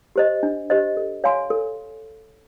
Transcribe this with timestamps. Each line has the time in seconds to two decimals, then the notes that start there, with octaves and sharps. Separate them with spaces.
0.16 G4 C5 D#5
0.43 D4
0.70 G4 C5 D#5
0.97 A4
1.24 C#5 F5 G#5 C6
1.50 A4